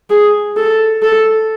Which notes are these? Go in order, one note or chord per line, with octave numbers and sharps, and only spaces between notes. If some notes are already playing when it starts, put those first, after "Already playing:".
G#4
A4
A4